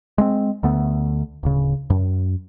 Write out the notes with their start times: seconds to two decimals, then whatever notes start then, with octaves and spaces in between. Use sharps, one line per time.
0.18 G#3 A3 C4
0.63 D2 D3 A3 B3
1.43 D1 C#3
1.90 F#2